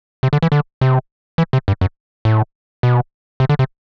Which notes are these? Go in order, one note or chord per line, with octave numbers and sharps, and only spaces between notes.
C3
D3
E3
D3
C3
E3
C3
G2
F#2
A2
B2
C3
D3
C3